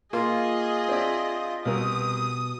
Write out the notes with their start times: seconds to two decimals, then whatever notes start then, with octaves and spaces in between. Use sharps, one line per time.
0.13 A#3 F4 G#4 D#5
0.88 C4 D4 E5
1.65 C2 B2 A#4 D#6